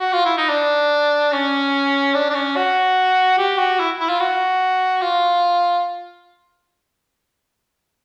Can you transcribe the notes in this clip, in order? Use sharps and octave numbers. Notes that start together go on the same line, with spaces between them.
F#4
F4
E4
D#4
D4
C#4
D4
D4
C#4
F#4
G4
F#4
E4
E4
F4
F#4
F4